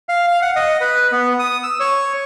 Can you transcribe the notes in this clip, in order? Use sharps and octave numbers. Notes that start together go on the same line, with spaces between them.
F5
F5
F#5
D#5
B4
B3
D#6
E6
C#5